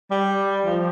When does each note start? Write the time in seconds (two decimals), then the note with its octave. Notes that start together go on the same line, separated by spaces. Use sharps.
0.11 G3
0.65 F3